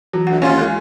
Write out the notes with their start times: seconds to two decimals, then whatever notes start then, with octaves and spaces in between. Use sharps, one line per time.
0.13 E3 F#3
0.27 D2 F#5
0.42 D#2 C#4 F4 C#5 G#5
0.58 G#3 A4